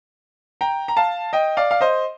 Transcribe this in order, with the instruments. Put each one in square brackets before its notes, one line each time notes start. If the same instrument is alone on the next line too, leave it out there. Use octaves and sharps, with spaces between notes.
[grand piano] G5 A#5
A#5
F5 A5
D#5 G5
D5 F5
F5
C5 D#5